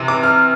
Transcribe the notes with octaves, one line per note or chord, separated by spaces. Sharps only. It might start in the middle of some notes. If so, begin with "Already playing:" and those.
Already playing: C3 E3
D6
F6